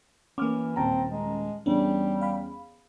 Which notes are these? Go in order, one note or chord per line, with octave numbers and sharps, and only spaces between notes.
E3 A#3 C#4 D6 F6
D#1 C4 A5 A#5
G#3
E2 G3 C#4 D4
F5 B5